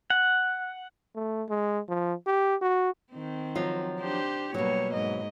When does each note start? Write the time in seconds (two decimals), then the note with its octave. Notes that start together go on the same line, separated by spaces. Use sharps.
0.10 F#5
1.15 A3
1.49 G#3
1.89 F3
2.27 G4
2.62 F#4
3.12 D#3 C4
3.55 F3 F#3 F4
4.00 D4 G4 C5
4.54 B2 F#3 G3 A#3 C#5
4.93 G#2 D#5